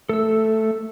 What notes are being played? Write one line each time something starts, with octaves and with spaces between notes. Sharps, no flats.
A3 A4 E6